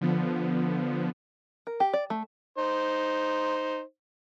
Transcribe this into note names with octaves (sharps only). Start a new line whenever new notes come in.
D3 F3 B3
A#4
G4
D5
A3
D#4 C5